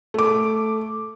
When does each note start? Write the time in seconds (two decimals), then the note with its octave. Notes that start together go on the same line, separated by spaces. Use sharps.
0.14 A3 D6